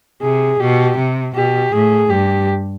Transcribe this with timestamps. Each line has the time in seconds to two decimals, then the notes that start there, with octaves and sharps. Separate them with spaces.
0.22 C3 G#4
0.60 B2 G4
0.98 C3
1.35 B2 G4
1.72 A2 G#4
2.10 G2 G4